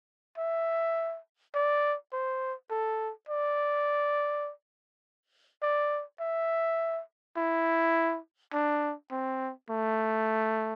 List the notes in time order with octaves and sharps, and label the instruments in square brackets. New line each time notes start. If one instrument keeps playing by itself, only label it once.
[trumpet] E5
D5
C5
A4
D5
D5
E5
E4
D4
C4
A3